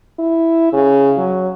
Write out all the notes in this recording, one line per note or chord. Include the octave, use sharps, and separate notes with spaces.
E4
C#3
F#3